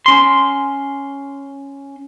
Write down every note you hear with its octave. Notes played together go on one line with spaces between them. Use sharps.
C#4 C6